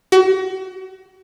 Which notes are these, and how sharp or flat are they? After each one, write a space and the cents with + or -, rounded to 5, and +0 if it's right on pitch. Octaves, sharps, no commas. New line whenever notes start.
F#4 +35